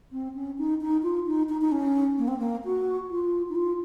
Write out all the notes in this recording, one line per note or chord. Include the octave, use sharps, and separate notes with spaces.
C4
C#4
D#4
D#4
F4
D#4
D#4
D#4
C#4
A#3
C4
A#3
F#4
F4
D#4
F4